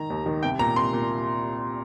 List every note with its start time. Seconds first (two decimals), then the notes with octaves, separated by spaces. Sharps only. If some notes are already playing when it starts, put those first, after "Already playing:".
Already playing: D#3 A#5
0.10 D#2
0.26 D#3
0.43 C2 G5
0.59 A#2 A#5
0.76 C2 C6
0.93 A#2